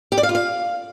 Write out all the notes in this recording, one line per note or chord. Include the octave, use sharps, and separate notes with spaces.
G4
D5
F5
F4
F5